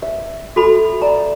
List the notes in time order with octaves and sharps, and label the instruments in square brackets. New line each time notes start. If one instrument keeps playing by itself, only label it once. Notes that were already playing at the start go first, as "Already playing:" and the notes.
[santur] E5
[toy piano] F#4 A4 B5
[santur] D5 [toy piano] A#5